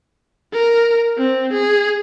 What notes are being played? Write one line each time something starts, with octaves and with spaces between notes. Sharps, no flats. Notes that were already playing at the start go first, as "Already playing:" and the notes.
A#4
C4
G#4